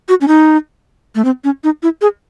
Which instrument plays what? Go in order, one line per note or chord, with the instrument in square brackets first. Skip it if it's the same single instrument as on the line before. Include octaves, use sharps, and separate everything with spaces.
[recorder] F#4
C#4
D#4
A3
C4
C#4
D#4
E4
G#4